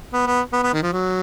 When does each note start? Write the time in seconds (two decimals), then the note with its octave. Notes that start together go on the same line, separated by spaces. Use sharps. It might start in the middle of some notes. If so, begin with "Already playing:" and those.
0.13 B3
0.27 B3
0.53 B3
0.63 B3
0.73 D#3
0.83 F3
0.92 F#3